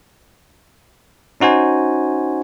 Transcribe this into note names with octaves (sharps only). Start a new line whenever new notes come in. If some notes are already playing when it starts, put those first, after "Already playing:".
C#4 D#4 F#4 C5 G#5